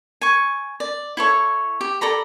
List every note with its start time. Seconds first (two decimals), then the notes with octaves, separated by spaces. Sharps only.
0.21 G#5 C#6
0.80 D5
1.17 E4 A4 C#5
1.81 G4
2.01 A4 D5 A#5 B5